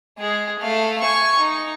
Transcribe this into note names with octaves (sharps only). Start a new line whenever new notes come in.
G#3 G#4
A3 F5
G#5 C#6
D#4